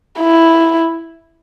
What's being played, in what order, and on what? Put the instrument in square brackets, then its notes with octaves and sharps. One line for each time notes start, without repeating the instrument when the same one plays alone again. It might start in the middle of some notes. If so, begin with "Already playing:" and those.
[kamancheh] E4